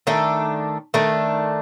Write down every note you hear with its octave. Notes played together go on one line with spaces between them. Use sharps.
D#3 A3 D4 A4
D#3 A3 D4 A4